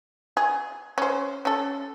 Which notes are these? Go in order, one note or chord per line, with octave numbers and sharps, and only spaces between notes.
G#4
C#4 C5
C#4 A4